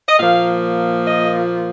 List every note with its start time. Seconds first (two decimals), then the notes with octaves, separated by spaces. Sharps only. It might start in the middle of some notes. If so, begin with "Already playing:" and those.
0.09 D#5
0.19 A#2 F3 A#3 F5
1.07 D#5